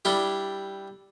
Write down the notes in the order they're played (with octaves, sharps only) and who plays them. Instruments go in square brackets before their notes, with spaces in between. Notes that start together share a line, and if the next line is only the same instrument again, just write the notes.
[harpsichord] G3 D4 E4 G4